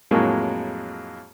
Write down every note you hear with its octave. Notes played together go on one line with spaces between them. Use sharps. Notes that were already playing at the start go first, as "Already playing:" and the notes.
F2 A2 F#3 G#3 A#3